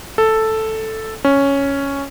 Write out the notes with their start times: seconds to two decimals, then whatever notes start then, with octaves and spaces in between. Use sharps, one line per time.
0.18 A4
1.25 C#4